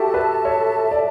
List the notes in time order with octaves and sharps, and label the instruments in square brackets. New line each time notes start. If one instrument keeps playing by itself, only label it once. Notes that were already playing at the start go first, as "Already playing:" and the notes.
Already playing: [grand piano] F#4 G4 [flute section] A4 E5 A5
[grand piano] B4
C#5
D5